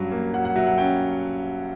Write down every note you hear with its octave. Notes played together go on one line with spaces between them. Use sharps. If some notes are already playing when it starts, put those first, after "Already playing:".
Already playing: G2 F#3 C#4
A#3
F#3 F#5
F#5
F#3 E5
F#5
C#4 G5